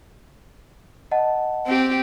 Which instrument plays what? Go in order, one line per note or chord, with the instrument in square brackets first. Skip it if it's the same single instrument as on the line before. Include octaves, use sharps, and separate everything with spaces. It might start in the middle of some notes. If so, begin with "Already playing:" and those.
[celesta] D#5 F#5 A5
[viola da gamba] C4 G4